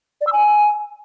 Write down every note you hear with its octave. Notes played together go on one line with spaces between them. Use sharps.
D5
E6
G#5